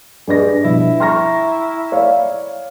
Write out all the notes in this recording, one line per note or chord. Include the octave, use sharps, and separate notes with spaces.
G2 G#4 B4 D5 D#5 A#6
B2 F3 G3 E4
G5 A#5 C6 C#6 F6 A#6
C#5 D5 F5